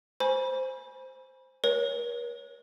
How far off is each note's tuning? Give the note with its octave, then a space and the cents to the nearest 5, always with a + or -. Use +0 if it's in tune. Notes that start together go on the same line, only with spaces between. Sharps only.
C5 +0 G#5 +0 B5 -30
A#4 +45 C#5 +0